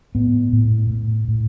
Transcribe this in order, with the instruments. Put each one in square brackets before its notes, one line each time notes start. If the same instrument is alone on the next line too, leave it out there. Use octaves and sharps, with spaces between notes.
[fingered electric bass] A2 B3
A2
A2
A2